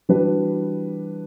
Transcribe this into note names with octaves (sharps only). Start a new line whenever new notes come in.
E3 G3 D4 F#4 B4